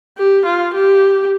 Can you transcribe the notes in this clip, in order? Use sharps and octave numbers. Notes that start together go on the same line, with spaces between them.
G4
F4
G4